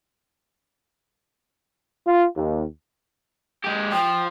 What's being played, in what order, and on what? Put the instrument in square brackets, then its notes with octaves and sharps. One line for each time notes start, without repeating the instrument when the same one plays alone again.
[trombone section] F4
D#2
[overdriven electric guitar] G#3 G4
[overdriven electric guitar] F3 [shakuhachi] G5